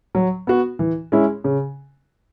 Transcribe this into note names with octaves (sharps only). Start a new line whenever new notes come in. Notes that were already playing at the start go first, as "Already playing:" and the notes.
F#3
B3 F#4
E3
G#3 C#4 E4
C#3